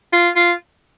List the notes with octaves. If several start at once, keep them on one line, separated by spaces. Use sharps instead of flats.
F4
F4